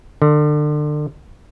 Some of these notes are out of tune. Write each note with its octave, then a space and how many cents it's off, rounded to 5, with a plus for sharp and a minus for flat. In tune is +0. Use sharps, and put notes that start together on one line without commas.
D3 +30